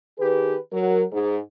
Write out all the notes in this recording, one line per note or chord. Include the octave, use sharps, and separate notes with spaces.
D#3 G4 G#4 B4
F#3 A#4
G#2